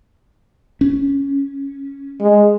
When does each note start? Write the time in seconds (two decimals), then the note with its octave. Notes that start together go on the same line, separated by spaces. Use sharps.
0.81 C#4
2.21 G#3